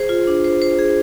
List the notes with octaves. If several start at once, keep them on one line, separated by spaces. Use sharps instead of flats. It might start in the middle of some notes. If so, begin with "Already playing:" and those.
Already playing: G#4 C5
F4
D4
C5
C5
G#4